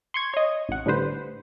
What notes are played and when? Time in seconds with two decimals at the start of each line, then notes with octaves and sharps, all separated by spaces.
0.14 C6 C#6 G#6
0.34 C#5 D#5
0.69 A1 F#5
0.86 A2 D3 G3 B4 C5